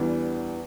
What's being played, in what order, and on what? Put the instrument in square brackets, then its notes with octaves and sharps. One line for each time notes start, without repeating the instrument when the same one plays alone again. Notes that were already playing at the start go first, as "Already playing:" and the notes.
Already playing: [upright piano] E2 E3 G3 D4